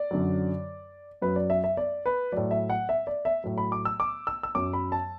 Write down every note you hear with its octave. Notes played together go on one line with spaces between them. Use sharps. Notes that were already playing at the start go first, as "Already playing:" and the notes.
Already playing: D5
F#2 D3 F#3
F#2 F#3 B4
D5
E5
E5
D5
B4
A2 F#3 D5
E5
F#5
E5
D5
E5
A2 F#3
B5
D6
E6
D6
E6
E6
F#2 F#3 D6
B5
A5